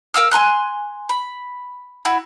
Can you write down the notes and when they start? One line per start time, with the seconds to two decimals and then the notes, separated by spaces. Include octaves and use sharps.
0.14 A#4 F5 E6 F6
0.31 G#5 A#5 C6 F#6
1.09 B5
2.05 E4 F#4